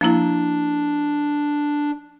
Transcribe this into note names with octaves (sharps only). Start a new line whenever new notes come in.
F3 A#3 D4 E4